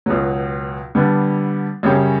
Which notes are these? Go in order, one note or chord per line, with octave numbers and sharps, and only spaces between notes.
C#2 B2 F#3
D3 G3 B3 D4
F#2 C#3 G3 C#4 G4